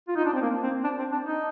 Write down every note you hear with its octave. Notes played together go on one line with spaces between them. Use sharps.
F4
D#4
D4
C4
A#3
C4
D4
C4
D4
D#4